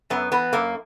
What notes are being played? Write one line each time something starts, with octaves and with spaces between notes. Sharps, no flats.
F#2 B3
E3 B3
F#2 A#3